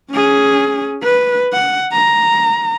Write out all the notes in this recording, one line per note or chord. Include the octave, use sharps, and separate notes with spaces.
C#4 G#4
B4
F#5
A#5